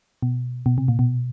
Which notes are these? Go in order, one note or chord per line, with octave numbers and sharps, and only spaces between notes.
B2
B2
C3
A#2
B2